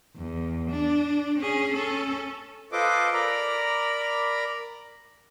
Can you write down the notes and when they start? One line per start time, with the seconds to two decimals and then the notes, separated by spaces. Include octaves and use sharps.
0.16 E2
0.70 D4
1.38 C#4 G#4
1.74 C#4 A4
2.72 F4 A4 B4 C5 D#5 D6
3.13 A#4 D5 A#5 B5